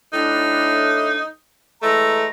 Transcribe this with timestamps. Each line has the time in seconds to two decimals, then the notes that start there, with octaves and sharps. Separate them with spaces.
0.13 A2 D4 D#4
1.82 E3 G#3 A3 A#5